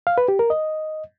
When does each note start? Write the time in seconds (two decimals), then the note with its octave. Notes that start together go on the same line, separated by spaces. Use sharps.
0.07 F5
0.18 B4
0.28 G4
0.39 A#4
0.50 D#5